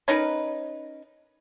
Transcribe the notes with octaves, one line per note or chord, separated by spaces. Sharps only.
C#4 D#4 A#4 B4